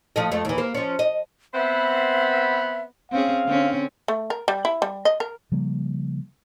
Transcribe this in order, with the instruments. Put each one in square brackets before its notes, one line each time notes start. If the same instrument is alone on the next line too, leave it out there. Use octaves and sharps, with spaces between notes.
[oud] F3 A3 D#5
F2 A3
D#2 E3
A#3 C5
F3 C#4
D#5
[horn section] B3 C4 B5 [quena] E5
[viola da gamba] C4 C#4 G#4 [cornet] F5
[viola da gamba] D3 C4 C#4
[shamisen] A3
A#4
G3
E4
G3
D#5
A#4
[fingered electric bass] C#3 F3 G3 A#3